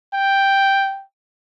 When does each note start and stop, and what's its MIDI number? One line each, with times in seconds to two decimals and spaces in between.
0.15 1.04 79